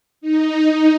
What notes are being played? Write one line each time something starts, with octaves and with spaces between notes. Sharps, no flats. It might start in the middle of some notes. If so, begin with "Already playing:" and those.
D#4